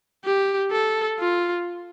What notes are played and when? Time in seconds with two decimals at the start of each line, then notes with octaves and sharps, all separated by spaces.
0.25 G4
0.72 A4
1.19 F4